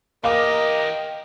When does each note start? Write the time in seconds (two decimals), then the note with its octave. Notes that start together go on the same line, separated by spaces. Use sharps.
0.24 E3 G4 A#4 D#5 F5 D6